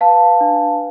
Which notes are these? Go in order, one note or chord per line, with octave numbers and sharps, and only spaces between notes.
B4 F5 A5
D4